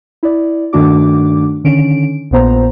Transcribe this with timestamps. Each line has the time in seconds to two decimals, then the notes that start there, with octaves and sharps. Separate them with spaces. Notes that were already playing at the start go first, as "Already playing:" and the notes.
0.23 E4 D5
0.73 G2 D#3 A3 D4 F#4 D6
1.64 D3 D#3 C#4 D7
2.31 A#1 A#2 B3 C5 A#5